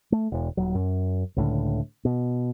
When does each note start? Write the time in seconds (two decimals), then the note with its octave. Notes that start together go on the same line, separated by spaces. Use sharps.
0.12 A3
0.32 E1
0.57 D#1 F#3
0.75 F#2
1.37 C#2 A2 D3
2.05 B2